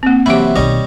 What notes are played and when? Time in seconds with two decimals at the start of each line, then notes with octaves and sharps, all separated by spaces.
0.03 A#3 C4
0.26 C3 E3 F#3 A#3 E4 G4 B5
0.56 B1 D#3 G3 C#5 D#5